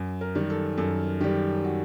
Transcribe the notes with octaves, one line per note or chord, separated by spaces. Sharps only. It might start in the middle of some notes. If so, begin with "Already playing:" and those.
Already playing: F#2
A#4
D#3 G3
A4
F#2 A4
D#3 G3 G4
F#4